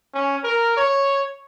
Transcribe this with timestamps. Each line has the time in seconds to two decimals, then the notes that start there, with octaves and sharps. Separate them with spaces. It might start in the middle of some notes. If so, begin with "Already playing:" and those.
0.14 C#4
0.44 A#4
0.77 C#5